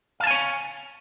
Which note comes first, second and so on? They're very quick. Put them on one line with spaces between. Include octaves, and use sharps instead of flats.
F5 A5 G#5 C#5